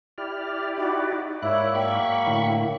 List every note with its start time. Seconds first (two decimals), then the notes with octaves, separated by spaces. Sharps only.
0.18 E4 G4 D5 F6
0.78 D#4 F#4
1.42 G#2 A#3 E4 C#5 D5 F#6
1.74 F#3 A#3 G5 B5 C#6
2.27 A2 D3 E4